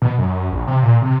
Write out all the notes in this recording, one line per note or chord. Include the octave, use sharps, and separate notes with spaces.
B2
F#2
A#1
C3
A#2
C3